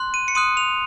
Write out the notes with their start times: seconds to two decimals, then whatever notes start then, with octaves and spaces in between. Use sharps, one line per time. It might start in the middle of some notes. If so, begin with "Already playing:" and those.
Already playing: C6 F#6
0.14 D#7
0.28 C#7
0.35 C6 D#6 F#6 D#7
0.57 F7